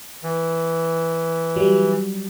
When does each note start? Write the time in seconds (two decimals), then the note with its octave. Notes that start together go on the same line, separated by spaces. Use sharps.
0.23 E3
1.56 F#3 G3